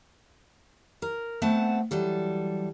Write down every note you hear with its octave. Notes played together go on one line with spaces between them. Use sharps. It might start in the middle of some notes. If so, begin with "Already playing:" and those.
A#4
A3 B3 C4 F#5 A5
E3 F#3 G3 A4